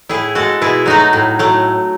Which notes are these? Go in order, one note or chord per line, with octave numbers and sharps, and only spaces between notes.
A2 E4 G#4
G#3 F#4 A4
B2 E4 G#4
F#3 A3 D#4 F#4
A2
F#3 A3